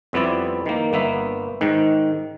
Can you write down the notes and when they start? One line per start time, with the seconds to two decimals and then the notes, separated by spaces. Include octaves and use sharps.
0.13 F2 G3 B3 C4 E4 D5
0.66 D#3 A#3
0.93 G1 A#3 B3 E5
1.61 G#2 D#3